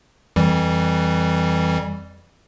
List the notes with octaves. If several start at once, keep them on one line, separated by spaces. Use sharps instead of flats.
F2 E3 G3